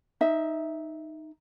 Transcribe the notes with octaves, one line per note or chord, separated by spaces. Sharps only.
D#4 E5